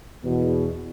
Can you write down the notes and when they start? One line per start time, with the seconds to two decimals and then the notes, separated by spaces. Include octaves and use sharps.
0.24 E2 B2